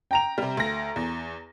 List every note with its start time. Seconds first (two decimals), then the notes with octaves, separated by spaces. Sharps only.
0.11 G5 A#5 F7
0.38 C3 G3
0.57 D2 A#6
0.96 E2